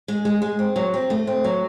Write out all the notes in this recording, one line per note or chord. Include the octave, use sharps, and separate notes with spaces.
G#3
G#3
G#3
C4
F#3
C4
A3
C4
F#3